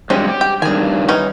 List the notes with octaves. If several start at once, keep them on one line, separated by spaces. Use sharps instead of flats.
G2 F#3 G#3 C4 C#4
G4
G5
G2 D#3 G#4 G#5
E3 C#4 D#4